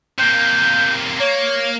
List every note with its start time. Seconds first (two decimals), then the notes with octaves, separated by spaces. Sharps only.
0.19 C3 A#3 G6
1.20 A#3 C#5